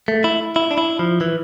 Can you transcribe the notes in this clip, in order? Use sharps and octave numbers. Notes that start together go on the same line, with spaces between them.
A3
E4
E4
D4
E4
F3
E3